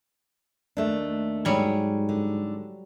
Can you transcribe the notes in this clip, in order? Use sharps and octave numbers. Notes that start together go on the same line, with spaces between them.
D#2 A3 D4
G#2 F#3 G3 G#5
D3